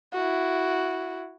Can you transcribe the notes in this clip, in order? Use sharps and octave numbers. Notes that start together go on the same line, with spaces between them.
E4 F#4